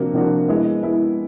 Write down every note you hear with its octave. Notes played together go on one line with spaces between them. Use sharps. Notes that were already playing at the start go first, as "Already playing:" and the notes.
Already playing: C3 F3 A#3 D4 F#4
C3 F3 A#3 D4 F#4
G#3 B3 E4
G#3 B3 E4